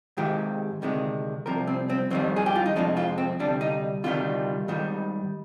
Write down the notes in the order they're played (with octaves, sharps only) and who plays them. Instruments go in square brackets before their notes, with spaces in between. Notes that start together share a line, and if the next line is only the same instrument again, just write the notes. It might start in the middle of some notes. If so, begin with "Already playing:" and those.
[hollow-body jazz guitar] G#2 D#3 G#3 G4
D2 C3 D#3 G#3
C2 C3 F3 A#4
C4
C4
F2 D#3 G3 C4
G#4
G4
F4
D#4
F2 C3 F3 G#3 D4
F4
C4
D2 C3 G3 D4
D#4
D2 C3 D#3 G3 F4
G#2 D#3 G3